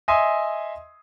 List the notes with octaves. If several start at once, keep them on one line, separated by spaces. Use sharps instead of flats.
D#5 E5 G#5 C6 D#6